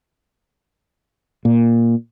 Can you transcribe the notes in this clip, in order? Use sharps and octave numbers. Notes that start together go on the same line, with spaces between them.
A#2